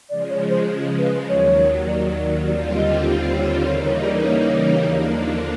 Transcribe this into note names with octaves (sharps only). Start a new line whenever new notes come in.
C#3 F3 G#3 D5
C#5
C5
B4
D#2 D#3 F#3 C#5
D5
D5
D#2 D3 G3 C4 F4 D5
D5
D#5
C5
C#5
C#3 E3 G3 A#3 D#4 C#5
C#5
D5
C#5
D#2 D3 F3 A#3 D4